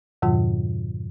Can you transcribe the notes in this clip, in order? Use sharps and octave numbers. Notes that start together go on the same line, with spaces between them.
F2 G#2 B2 D#3 F#3 F4